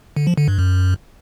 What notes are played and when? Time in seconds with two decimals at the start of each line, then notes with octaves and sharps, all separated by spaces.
0.16 D3
0.27 F3
0.38 D3
0.48 G2
0.59 F#2